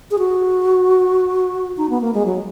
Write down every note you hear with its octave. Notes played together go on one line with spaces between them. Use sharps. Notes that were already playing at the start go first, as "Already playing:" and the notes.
G#4
F#4
D#4
B3
A#3
G#3
F#3